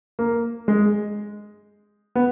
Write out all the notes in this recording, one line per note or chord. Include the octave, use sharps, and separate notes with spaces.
A#3
G#3
B3